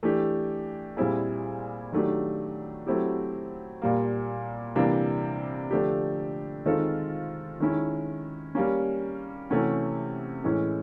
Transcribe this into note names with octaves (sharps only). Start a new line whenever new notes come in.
E3 A3 D4 G4
A#2 G3 C4 E4 G#4
D#3 F#3 A3 D4 G4
F#3 A3 C4 E4 G4
A#2 G3 A#3
C3 E3 G3 A#3 D4
D3 F3 A3 D4 G4
D#3 G#3 C4 F4 A4
D#3 G#3 C#4 E4
G3 A#3 C#4
C3 E3 A3 C#4 F#4
A2 E3 G#3 C#4